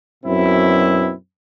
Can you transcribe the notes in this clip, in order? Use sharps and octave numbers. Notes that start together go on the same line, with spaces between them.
F#2 B2 C4 E4